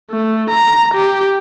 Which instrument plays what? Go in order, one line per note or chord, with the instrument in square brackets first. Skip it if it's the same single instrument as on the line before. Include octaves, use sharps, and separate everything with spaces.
[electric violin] A3
A#5
G4